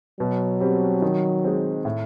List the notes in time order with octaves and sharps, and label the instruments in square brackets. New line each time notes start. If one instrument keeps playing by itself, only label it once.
[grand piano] B2 [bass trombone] F#3
[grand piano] G3 C4
D#3
G#3 C4
A2